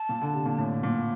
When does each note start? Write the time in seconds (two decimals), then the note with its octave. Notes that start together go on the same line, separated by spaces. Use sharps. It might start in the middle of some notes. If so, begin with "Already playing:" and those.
Already playing: A5
0.09 A#2
0.22 D3
0.34 C3
0.46 A#2
0.58 A2
0.83 A#2